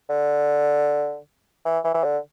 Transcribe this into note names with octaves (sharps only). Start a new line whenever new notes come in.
D3
E3
E3
E3
D3